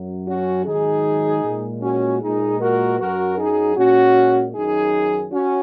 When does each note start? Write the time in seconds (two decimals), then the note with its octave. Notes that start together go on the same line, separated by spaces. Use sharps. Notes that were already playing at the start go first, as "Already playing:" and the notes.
Already playing: F#2 F#3
0.28 C#4 F#4
0.66 G#2 D#3 F#3 D#4 G#4
1.44 A#2 G#3
1.82 C#4 F#4
2.22 A#2 G#3 D#4 G#4
2.61 F#4 A#4
2.99 F#2 F#3 F#4 A#4
3.38 D#4 G#4
3.77 A#2 G#3 C#4 F#4
4.55 F#2 D#3 F#3 D#4 G#4
5.32 C#4 F#4